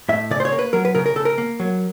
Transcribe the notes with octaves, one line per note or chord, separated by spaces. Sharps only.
A2 E5
C#3 D5
C5
C#5
A#3
B4
F#3 A#4
B4
C#3 A#4
A#4
C#3 A4
A#4
A#3
F#3